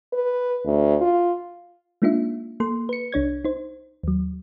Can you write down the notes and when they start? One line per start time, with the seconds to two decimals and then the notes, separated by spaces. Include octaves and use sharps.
0.13 B4
0.65 D2
1.01 F4
2.02 G#3 A#3 D4 D#4 F4 E5
2.60 A#3 A4 C6
2.89 B4 C#7
3.12 C2 D4 C#5 G#6
3.44 D#4 C5
4.03 D#2 F#3